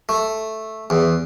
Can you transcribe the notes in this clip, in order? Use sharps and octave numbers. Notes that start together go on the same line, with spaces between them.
A3
E2